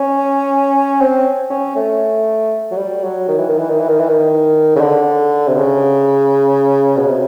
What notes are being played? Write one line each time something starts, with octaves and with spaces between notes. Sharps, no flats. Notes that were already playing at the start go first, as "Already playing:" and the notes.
Already playing: C#4
C4
C#4
A3
F#3
G3
F#3
D#3
E3
D#3
E3
D#3
E3
D#3
E3
D#3
C#3
D3
C3
C#3
B2
C3